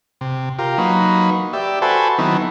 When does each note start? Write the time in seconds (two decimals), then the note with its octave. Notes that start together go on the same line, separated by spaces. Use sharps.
0.21 C3
0.59 F4 G4 A#4
0.78 F#3 A#3 D#4 B4
1.53 G4 D5 E5
1.82 F#4 A4 B4 C5 G#5 A5
2.19 D#3 F#3 B3 C4 D#4 E4